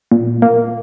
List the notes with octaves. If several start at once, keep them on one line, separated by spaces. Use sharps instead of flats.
A#2
A#3